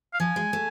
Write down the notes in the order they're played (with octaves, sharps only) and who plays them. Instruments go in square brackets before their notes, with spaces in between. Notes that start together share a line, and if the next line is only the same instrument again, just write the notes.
[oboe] F5
[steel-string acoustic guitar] F3 [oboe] G#5
[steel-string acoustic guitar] G#3
A3